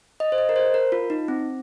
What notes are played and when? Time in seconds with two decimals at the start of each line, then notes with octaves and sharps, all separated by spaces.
0.20 D#5
0.32 C5
0.38 D#5
0.49 A#4
0.56 C5
0.74 A#4
0.92 F4
1.10 D#4
1.28 C4